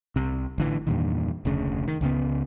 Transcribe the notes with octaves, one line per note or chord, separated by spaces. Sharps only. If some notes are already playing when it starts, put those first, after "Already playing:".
C2 C3
A1 D3 E3
E2 G2 A#2 D#3
F1 D2 C#3
D#3
C#2 C#3 B3